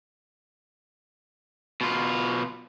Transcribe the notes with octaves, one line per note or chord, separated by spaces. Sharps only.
B2 F4